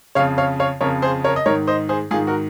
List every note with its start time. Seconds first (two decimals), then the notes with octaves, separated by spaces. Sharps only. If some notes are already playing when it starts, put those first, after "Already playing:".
0.15 C#3 C#5 F5
0.19 F2
0.38 C#5 F5
0.60 C#5 F5
0.81 F2 C#3 A#4 C#5
1.02 G#4 C5
1.24 A#4 C#5
1.36 D#5
1.46 G#2 D#3 A#4 C#5
1.67 C5 D#5
1.89 G#4 C5
2.11 G#2 F4 G#4
2.14 D#3
2.27 F#4 A#4